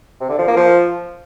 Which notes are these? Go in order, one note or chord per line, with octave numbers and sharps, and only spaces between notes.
C3
D3
F3
A#3
F3